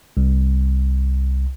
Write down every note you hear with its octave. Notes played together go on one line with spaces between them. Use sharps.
C2